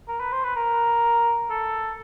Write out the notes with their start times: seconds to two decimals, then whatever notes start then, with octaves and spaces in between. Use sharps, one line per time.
0.08 A#4
0.20 B4
0.32 C5
0.44 B4
0.56 A#4
1.50 A4